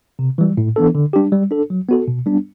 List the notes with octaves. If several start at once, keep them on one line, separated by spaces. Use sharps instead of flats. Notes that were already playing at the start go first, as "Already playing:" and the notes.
C3
E3 G3
A2
E3 B3 D4 A4
D3
G3 D4 G4
G3
D4 A4
F#3
B3 F#4 A4
B2
G3 B3 D4